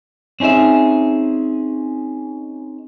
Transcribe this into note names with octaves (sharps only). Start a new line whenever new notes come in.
C4 C#4 D#4 G#4 E5